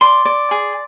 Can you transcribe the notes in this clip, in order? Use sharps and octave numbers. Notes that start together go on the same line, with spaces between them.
D5 C6
D5
G#4